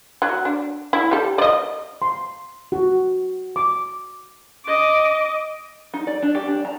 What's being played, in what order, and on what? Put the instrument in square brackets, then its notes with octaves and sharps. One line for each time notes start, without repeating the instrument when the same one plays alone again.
[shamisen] F#3
D4
E4
G4 A4
D5 D#5
[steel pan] C6
F#4
D6
[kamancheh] D#5 D6
[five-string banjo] D#4
D5
D4
G4
D4
A#5